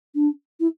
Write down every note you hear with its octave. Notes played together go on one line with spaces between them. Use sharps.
D4
E4